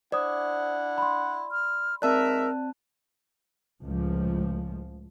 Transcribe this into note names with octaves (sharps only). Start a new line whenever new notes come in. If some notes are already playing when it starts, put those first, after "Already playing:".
D4 E4 C5 D5 F#5 D#6
B5 C6
F6
G#2 C4 A#4 D5 E5 A5 F#6
C#2 A2 F3